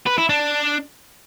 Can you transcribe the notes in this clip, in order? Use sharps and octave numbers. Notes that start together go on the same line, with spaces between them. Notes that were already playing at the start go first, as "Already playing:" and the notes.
B4
E4
D4